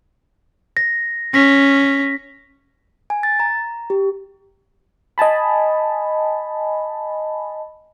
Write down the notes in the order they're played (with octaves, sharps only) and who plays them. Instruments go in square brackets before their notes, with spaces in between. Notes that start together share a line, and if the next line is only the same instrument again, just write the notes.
[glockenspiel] A#6
[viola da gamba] C#4 [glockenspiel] A#6 B6
[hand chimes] G#5
A6
A#5
G4
[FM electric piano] D#5 G#5 A5 B5